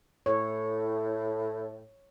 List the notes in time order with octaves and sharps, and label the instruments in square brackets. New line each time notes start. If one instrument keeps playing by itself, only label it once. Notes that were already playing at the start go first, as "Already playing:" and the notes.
[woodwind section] A2 [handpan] C#5